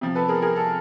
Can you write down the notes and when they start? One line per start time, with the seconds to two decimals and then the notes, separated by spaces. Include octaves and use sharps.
0.01 C3 F3
0.15 A4 B4
0.28 G#4 A#4
0.42 G#4 A#4
0.56 A4